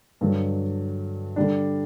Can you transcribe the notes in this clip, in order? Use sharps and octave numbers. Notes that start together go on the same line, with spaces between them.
G2 D3 F#3
D3 G3 D4